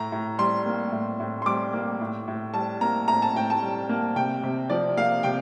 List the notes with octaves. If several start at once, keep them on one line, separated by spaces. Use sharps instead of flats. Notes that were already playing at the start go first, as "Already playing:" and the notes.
Already playing: A2 A#5
A2
G3 C6
A#3
A2
A2
C6
G3 D6
A#3
A2
A2
G3 A5
A#3 A#5
A2 A#5
A5
A2 G5
A5
G3
A#3
C3 G5
C3
F3 D5
A#3 F5
C3 G5